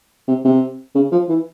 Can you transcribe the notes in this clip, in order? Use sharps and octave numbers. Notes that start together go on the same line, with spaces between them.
C3
C3
C#3
F3
E3